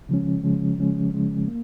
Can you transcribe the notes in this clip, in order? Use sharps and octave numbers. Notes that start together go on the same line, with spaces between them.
C#3 F3 G#3 C#4
C#3 F3 G#3 C#4
C#3 F3 G#3 C#4
C#3 F3 G#3 C#4
A#3